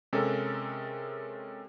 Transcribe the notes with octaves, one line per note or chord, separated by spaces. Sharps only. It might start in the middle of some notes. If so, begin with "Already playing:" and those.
C3 G#3 C#4 A4 A#4